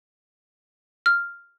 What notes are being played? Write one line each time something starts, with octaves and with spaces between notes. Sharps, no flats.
F6